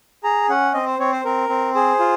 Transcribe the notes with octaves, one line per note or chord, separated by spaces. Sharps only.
G#4 A#5
C#4 F#5
C4 D#5
C5
C4 C#5
C5
C4 A#4
C4
G#4 C5
F4